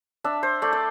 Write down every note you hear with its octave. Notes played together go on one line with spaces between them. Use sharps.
D4 E5
C5
A3 D5
D5